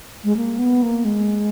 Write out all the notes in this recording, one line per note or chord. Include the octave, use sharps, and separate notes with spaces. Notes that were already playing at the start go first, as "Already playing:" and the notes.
G#3
A#3
B3
A#3
G#3